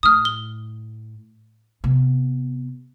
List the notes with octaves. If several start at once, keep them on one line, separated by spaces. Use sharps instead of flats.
A2 D#6 F6
G7
C3 B3